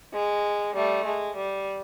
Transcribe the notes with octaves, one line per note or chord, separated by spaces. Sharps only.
G#3
G3 A3
G#3
G3